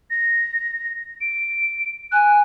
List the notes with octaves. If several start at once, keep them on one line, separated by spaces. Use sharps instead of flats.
A#6
D7
G#5 F#6